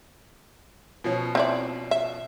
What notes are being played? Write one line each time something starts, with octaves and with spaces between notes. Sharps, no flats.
B2 F3 C#4
C4 E4 D5
E5